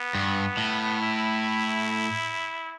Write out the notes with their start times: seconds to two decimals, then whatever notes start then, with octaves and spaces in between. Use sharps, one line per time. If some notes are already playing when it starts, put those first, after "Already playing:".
Already playing: B3
0.15 G2
0.57 A2
1.01 E4